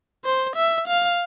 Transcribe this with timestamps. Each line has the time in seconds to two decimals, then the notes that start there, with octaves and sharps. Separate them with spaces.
0.25 C5
0.56 E5
0.88 F5